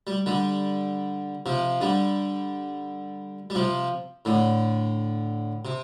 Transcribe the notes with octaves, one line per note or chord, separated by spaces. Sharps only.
G3
D3 G3
C3 F3
D3 G3
G3
C3 F3
A2 D3
C3